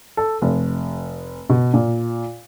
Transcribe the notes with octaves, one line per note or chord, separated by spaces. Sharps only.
A4
F1
B2
A#2